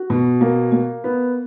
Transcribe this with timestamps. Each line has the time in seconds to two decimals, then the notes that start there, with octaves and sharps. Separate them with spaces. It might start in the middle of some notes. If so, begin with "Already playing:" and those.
Already playing: F#4
0.10 B2
0.41 A#3
0.72 A#3
1.04 B3